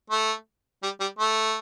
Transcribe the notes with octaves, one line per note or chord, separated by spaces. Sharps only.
A3
G3
G3
A3